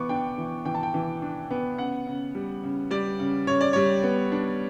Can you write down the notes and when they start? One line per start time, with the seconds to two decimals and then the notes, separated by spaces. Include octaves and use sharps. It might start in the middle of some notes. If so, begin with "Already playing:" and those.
Already playing: E3 B3 C#6 D6
0.09 D4 G5
0.38 E3
0.65 E3 G5
0.75 A5
0.83 G5
0.94 E3
1.22 D4
1.51 B3
1.78 C#3 F#5
2.07 C#3
2.35 G3
2.64 C#3
2.91 G3 D5
3.19 C#3
3.47 C#3 C#5
3.61 D5
3.73 G3 C#5
4.03 B3
4.32 D4